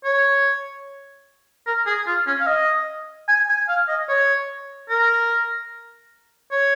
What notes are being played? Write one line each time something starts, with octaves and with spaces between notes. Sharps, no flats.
C#5
A#4
G#4
F4
C#4
F5
D#5
G#5
G#5
F5
D#5
C#5
A#4
C#5